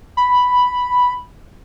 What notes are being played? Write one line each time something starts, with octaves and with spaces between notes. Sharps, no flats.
B5